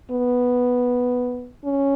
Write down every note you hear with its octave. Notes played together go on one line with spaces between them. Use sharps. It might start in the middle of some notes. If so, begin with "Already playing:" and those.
B3
C#4